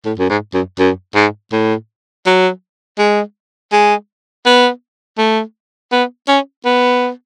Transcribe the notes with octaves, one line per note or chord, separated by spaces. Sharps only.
A2
F#2
G#2
F#2
F#2
G#2
A2
F#3
G#3
G#3
B3
A3
B3
C#4
B3